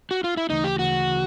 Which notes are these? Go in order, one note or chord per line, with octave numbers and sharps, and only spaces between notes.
F#4
F4
E4
D2 C#3 E3 A3 D#4
G4
D2 C#3 E3 A3 F#4
C#3 E3